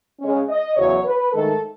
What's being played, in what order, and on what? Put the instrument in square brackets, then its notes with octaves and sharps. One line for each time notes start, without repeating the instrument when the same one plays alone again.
[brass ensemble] C#3 G#3 C#4
D#5
E2 C#3 F#3 C#5
B4
G#2 D#3 A3 A4